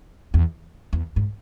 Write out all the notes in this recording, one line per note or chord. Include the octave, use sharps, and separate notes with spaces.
E2
E2
G#2